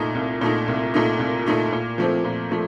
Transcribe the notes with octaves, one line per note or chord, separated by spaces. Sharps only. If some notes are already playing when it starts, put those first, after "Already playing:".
Already playing: C2 A#2 A3 D#4
C2
A#2 A3 D#4
C2
A#2 A3 D#4
C2
A#2 A3 D#4
A#2
F3 A3 C4
A#2
F3 A3